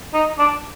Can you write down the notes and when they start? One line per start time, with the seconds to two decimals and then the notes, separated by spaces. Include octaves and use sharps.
0.14 D#4
0.39 D4